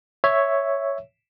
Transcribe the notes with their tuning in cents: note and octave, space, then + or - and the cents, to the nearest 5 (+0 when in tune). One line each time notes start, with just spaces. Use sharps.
C#5 +0 E5 +0